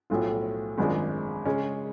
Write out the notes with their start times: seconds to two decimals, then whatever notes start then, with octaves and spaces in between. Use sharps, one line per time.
0.10 B1 A2 F3 A3 F4
0.78 G#1 F#2 F3 G#3 D4
1.45 C#3 G#3 C#4